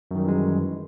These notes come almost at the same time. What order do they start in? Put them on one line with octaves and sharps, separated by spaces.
F#2 D#3 G3 E3 G#3